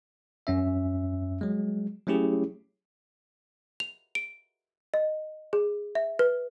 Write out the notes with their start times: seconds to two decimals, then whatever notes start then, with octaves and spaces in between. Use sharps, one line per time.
0.47 F#2 C#4 E5
1.41 F#3 G#3
2.07 F#3 A3 C#4 E4 G4 G#4
3.80 F7
4.15 D7
4.94 D#5
5.53 G#4
5.95 E5
6.19 B4